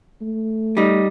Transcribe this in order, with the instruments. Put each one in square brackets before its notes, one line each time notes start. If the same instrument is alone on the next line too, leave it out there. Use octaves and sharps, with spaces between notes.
[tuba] A3
[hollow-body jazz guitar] G3 D#4